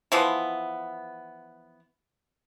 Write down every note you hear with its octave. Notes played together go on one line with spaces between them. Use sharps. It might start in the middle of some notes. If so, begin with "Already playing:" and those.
E3 F3 B3